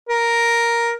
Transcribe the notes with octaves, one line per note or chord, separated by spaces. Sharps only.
A#4